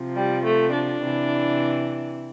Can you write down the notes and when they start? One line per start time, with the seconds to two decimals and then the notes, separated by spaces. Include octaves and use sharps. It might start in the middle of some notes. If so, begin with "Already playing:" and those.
Already playing: C3 F3
0.16 G3
0.45 A3
0.74 D4
1.02 C3 E3